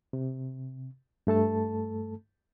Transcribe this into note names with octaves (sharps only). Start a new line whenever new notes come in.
C3
G2 A3 A4 A5